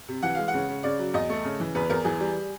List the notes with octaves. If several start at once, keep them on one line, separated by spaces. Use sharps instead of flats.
C3
E3 F#5
G#3 F5
F#5
C#3
C#3
C#3 D5
F#3
E2 D#5
A3
C#3
E3
E2 B4
E2 A#4
E3 G#4
G3